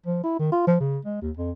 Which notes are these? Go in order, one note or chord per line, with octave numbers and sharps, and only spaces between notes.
F3
E4
D#3
F4
F3
C#3
G#3
D#2
F2